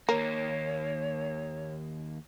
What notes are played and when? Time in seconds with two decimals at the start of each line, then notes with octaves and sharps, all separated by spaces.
0.09 D#2 A#3 A#4 C#5